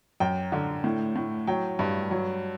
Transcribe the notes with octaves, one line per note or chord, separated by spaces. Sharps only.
F#2 G5
D3
A2
A2
F#3 G5
G2
F#3